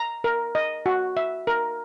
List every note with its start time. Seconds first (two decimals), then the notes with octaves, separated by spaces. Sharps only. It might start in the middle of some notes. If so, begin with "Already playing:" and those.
Already playing: A#5
0.24 A#4
0.55 D#5
0.86 F#4
1.17 E5
1.47 A#4